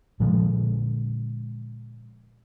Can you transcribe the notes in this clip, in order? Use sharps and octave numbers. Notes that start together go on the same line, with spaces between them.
A#2 D3 F3 G#3